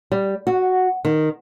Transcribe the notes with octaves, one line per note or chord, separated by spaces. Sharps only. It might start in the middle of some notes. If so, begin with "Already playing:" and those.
G3
F#4
D#3